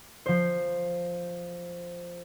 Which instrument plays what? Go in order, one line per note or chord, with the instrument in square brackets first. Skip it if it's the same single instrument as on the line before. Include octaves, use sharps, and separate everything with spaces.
[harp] F3 C5